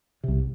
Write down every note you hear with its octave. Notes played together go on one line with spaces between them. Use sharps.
C2 C3